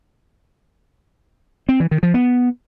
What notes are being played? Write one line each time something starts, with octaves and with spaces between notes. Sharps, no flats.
C4
E3
D#3
F3
B3